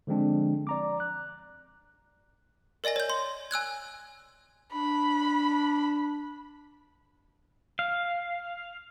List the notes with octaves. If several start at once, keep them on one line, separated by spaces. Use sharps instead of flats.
D3 F3 G#3 C4 D4
D5 A#5 D6
F#6
A#4 D5 D#5 G#5 A#6
C#5 G6
C6
G#5 E6 F#6 G#6
D4 B5
F5